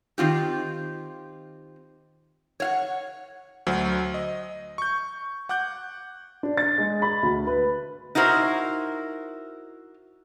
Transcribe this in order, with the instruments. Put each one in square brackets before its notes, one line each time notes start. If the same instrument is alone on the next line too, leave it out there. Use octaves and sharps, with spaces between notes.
[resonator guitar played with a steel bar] D#3 C4 F4 G4
C#5 F5 F#5
[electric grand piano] D2 F#3 C5
D#5
C#6 G6
F#5 D6 F#6 G6
[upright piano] D4
A6
G#3
B5
D2
B4
[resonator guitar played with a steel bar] D#4 E4 F#4 A#4 C5